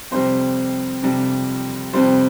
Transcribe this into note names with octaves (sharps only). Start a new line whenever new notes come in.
F2 C3 G3 C5
F2 C3 G3
F2 C3 G3 C5